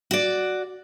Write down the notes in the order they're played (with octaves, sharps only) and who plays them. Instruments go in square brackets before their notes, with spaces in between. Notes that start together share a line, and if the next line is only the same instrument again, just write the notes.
[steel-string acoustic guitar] F#4 D5